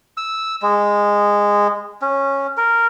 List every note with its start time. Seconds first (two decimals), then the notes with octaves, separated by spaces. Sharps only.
0.17 E6
0.62 G#3
2.02 C#4
2.57 A#4